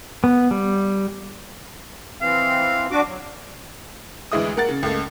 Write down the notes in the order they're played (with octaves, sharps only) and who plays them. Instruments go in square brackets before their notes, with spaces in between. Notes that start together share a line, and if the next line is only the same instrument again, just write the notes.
[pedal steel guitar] B3
G3
[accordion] E3 C4 [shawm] F5
[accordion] D4 F#4 D6
F#3
[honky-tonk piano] D2 E3 G#3 E4 D#6
A#3 A#4 F#5 A6
C#3
C#2 A3 A#3